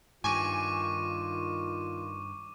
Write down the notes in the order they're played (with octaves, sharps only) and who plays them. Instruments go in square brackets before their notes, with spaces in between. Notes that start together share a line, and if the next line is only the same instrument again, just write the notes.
[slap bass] G2 [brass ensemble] D#3 F4 [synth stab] G#5 [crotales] C#6 D6 D#7